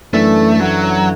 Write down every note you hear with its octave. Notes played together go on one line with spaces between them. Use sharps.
F#2 E3 A3 D4 A4 E5
F#3